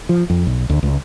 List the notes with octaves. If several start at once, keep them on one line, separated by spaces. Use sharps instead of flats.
F3
F2
B1
D2
C#2